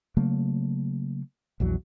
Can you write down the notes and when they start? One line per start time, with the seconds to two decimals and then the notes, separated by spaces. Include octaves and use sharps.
0.17 C#3 F#3 A3 A#3
1.60 A#1 E2 F#3